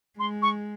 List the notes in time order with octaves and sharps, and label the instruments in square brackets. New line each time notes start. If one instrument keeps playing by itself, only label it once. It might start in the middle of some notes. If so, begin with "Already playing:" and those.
[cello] G#3 [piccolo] C6
[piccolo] C#6